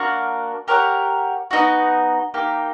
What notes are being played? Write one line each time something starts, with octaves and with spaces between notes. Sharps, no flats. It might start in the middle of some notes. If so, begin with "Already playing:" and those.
Already playing: A#3 D4 F#4 A#4
G4 A#4 C#5 F#5
B3 D#4 F#4
A#3 D#4 G4